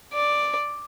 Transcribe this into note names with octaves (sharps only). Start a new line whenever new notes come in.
D5